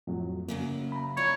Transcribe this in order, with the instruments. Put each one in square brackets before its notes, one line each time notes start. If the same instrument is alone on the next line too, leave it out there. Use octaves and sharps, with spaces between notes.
[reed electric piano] F2 A2 F#3
[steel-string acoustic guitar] F#2 C#3 F#3 [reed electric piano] A#3
[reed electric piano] A#5 B5
[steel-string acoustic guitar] E4 D5 [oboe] C#5